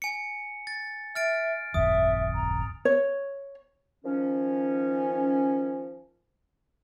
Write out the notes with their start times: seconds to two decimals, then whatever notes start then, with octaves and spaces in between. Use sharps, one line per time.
0.02 G#5 C#7
0.67 A6
1.15 E5 F6 A6 D7
1.74 D1 G1 F2 E5 D#6
2.35 A#5
2.85 C#5
4.04 D#3 F3 C#4